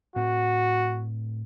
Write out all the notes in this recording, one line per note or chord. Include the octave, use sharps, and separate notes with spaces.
A2 C4 F#4